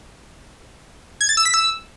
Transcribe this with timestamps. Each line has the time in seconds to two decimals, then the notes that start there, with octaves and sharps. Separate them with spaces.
1.21 G#6
1.29 A6
1.37 E6
1.45 B6
1.54 E6